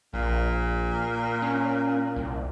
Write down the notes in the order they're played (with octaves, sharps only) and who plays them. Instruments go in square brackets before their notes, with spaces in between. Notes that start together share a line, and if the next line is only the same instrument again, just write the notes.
[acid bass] A#1 [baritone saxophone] A#2
[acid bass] C#4
C2